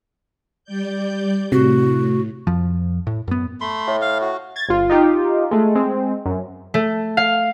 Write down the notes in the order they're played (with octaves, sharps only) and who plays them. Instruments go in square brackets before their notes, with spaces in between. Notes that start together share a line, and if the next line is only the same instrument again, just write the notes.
[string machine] G3 D5 G6
[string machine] A2 [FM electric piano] C3 [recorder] F#4
[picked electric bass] F2 F3
A2
F#2 B3
[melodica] A3 B5 C6
[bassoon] A2
[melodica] F5
F#4
[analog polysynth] G#6 A6
G1 F4
D#4 F4 G4
G#3 A3
G#3 C4
F#2
[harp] A3
F5